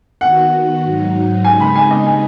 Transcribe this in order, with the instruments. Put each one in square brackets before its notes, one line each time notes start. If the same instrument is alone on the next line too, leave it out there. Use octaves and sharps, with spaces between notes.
[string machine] D#3 B3 F#4 [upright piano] F#5
[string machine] G#2 F#3 D#4
[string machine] C#3 G#3 B3 D#4 [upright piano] G#5
[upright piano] B5
G#5
D#5
G#5